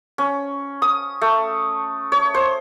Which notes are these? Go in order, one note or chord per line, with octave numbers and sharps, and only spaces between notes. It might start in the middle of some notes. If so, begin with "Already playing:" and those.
C#4
D#6
A3
C#5
C5